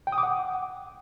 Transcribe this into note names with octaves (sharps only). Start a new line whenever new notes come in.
G5
D#6
D6
F#5